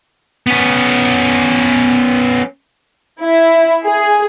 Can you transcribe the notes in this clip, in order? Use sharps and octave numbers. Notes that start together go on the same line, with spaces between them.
B3 C#4
E4
G#4